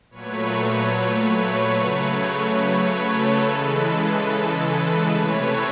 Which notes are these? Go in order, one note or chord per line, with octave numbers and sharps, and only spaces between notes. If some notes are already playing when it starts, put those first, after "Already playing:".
A#2 F#3 A3 B4 C#5
B4 C#5
C#3 F#3 A3
B4 C#5
A4 B4
C#3 E3 G#3
C3 E3 A3 B4 C#5